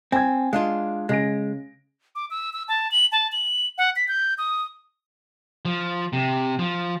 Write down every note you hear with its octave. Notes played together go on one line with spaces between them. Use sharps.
C4 G#5 G#6
G#3 D4 F4 F5
C#3 G#3 A#6 D7
D6
E6
E6
A5
F#7
A5
F#7
F#5
B6
G6
D#6
F3
C3
F3